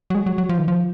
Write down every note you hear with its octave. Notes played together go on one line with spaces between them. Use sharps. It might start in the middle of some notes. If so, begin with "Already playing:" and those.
F#3
G#3
F#3
F#3
F3
D#3
F3